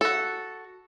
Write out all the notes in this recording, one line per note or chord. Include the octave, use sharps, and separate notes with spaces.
F#4 A4